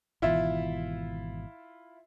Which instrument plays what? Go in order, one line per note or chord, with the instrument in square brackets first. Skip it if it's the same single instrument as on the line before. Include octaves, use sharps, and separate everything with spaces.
[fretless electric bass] G#1 B2 E3 [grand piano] E4 F4 E5